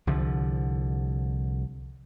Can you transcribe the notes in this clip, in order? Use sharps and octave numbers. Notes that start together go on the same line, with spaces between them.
C2 D3 F3